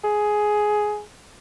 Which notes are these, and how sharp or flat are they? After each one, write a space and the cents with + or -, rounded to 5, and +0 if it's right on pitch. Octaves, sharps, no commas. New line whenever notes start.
G#4 +10